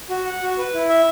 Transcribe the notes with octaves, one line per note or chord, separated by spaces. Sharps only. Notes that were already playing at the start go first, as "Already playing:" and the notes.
F#4
F#5
F#4
B4
E4
E5